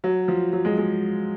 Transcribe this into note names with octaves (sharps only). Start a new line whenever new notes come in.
F#3
F3
F#3
G#3
G#3